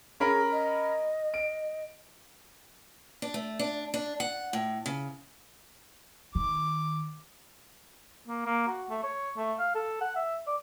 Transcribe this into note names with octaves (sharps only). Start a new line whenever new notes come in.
C#4 G#4 A#4 B5
D#5
D7
D4
A3
D4
D4
F#5
A2
C#3
D#3 D6
A#3
A#3
F#4
A3
C#5
A3
F5
A4
F#5
E5
D5